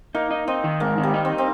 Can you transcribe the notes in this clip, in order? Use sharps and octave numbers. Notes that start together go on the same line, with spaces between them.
A#3 D#4
D#4
C4 D#4
D#3
G#2 A#3
D#3
G3
D#4
C4
C4